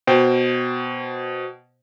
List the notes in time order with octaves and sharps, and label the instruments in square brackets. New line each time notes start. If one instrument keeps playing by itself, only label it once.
[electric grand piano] B2 C5 G5